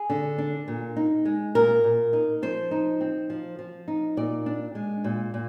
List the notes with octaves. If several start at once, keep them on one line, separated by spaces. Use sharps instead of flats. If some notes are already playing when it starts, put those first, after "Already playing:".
Already playing: G#4
D3
D4
A#2
D#4
G#3
A#2 A#4
A#2
D#4
F3 C5
D#4
C4
F3
F3
D#4
A#2 D5
D4
G#3
A#2
A#2